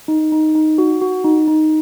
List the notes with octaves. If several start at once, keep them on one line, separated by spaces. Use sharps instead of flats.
D#4
D#4
D#4
F#4
F#4
D#4
D#4